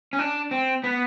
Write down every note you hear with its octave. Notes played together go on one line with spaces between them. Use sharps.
C#4
D4
C4
B3